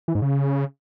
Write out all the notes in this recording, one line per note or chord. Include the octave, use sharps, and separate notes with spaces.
E3
G#2
C#3